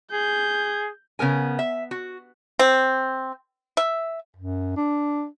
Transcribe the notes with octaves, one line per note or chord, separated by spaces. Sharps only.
G#4 G6
C#3 B3 A#4 G#5
E5
F#4
C4
E5
F#2
D4